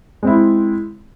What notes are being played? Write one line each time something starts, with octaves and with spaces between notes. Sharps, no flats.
G#3 C4 E4